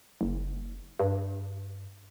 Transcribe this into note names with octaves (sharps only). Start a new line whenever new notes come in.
F#1
G2